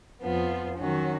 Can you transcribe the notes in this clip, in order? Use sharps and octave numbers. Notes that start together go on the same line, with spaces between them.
F2 F3 B3 F4
D#3 F#3 C#4 F#4